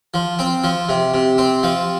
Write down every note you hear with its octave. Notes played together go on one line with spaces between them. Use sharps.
F3
C4
F3
C3
C3
C4
F3